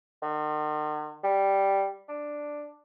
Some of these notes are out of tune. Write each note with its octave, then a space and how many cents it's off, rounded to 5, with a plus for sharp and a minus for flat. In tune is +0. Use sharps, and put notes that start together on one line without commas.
D#3 -45
G3 +0
D4 +5